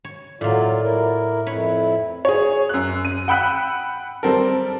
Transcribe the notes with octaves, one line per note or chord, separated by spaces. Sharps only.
C#5
A2 F#3 A#3 F4 D5
E4 A#4
F2 E4 B4 C#5
G#4 C#5
F#2 F#6
D#7
F#5 G5 B5 E6 F#6 B6
G3 C4 A4 A#4